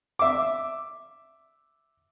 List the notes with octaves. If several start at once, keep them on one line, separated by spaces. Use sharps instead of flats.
E5 D6